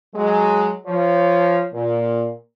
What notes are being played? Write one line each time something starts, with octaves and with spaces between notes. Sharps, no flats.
F#3 G#3
F3 C#5
A#2